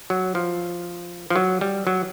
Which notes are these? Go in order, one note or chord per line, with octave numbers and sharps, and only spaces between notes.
F#3
F3
F3
F#3
G3
F#3